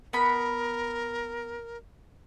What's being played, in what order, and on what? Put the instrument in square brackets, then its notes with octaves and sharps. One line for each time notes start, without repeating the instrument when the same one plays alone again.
[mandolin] B3 B5 [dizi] A#4